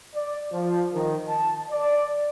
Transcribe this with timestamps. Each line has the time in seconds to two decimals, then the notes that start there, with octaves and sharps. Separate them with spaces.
0.15 D5
0.53 F3
0.92 D#3
1.27 A5
1.70 D5